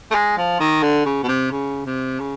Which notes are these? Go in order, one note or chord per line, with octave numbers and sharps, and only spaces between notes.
A3
G#3
F3
D#3
D3
C#3
B2
C3
C#3
C3
C#3